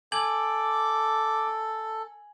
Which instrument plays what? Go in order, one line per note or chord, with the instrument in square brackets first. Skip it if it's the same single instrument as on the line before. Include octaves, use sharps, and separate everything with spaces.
[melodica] A4 [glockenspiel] G#5 G#6 F#7 [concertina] D6